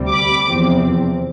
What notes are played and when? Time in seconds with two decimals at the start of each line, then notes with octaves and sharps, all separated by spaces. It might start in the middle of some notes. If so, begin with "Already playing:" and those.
Already playing: D2 C3 G3
0.10 B5 D6
0.46 E2 C3 F3 C4